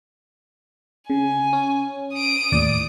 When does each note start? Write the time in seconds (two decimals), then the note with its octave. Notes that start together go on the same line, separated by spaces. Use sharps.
1.10 C#3 G#5
1.53 C#4
2.14 D#6 D7
2.52 D#2 A2 D5